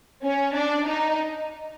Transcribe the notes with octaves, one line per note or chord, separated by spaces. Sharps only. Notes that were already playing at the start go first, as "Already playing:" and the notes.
C#4
D4
D#4